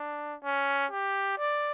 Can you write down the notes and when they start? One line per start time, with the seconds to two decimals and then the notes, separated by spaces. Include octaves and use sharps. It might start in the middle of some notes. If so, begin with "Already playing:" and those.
Already playing: D4
0.44 C#4
0.91 G4
1.38 D5